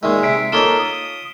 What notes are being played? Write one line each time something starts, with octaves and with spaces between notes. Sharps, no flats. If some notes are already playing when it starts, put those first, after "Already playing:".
A#2 D#3 G#3 E5
C3 B6 C7 D7
A#3 D#4 F4 A4 C#5 D#5 E7 G7
D#6